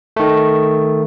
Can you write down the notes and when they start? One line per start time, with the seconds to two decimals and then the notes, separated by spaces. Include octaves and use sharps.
0.16 D#3 A3